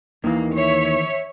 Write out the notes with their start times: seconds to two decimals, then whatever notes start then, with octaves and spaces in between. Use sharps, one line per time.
0.24 D#2 D#3 E3 A#3
0.54 C#5 E5